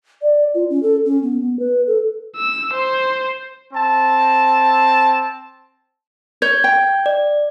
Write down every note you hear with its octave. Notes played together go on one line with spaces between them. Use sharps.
D5
F4
C#4
A4
C#4
B3
B3
B4
A4
E6
C5
C4 A5
C#5 G6 G#6
G5
D5